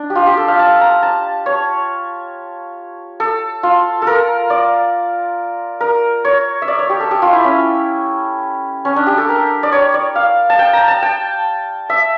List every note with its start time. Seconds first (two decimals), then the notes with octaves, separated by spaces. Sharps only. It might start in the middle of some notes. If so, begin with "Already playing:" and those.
Already playing: D4
0.10 G4
0.15 F4
0.26 G4
0.37 A4
0.48 F5
0.59 A5
0.81 A#5
1.02 A5
1.46 C#5
3.20 A4
3.63 F4
4.02 A4
4.07 A#4
4.50 D5
5.81 A#4
6.25 C#5
6.62 E5
6.68 D5
6.79 C#5
6.90 G4
7.00 A4
7.11 G4
7.22 F4
7.33 E4
7.44 C#4
8.85 C#4
8.96 D4
9.07 G4
9.18 A4
9.29 A#4
9.63 D5
9.72 C#5
9.94 D5
10.15 F5
10.50 A5
10.59 G5
10.73 A#5
10.88 A5
11.03 G5
11.90 E5